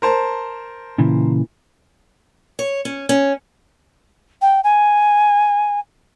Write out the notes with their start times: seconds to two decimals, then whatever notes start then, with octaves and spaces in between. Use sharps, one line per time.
0.02 A#4 C5 A5
0.98 A#2 C#3 E3
2.59 C#5
2.85 C#4
3.09 C#4
4.41 G5
4.63 G#5